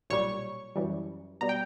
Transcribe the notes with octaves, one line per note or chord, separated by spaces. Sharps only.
B1 A#2 G3 C#5 C#6
F#2 E3 G3
B2 G3 A#5
G5